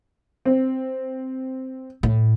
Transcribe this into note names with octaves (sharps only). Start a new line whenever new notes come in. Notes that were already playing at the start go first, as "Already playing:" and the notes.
C4
A2